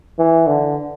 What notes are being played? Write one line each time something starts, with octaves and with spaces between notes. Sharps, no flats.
E3
D3